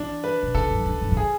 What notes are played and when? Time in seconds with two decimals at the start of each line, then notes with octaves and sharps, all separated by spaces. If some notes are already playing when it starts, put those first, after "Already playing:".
Already playing: E3 D4
0.24 B4
0.43 B2
0.54 C#3 A4
0.70 F#2
0.86 E2
1.01 F#2
1.12 A2
1.17 G#4